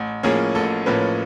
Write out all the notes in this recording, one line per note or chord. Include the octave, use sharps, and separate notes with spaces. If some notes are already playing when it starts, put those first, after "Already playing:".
Already playing: A1
A2 F3 A#3 C#4 G#4
A1 A4
A2 F3 A#3 C#4 B4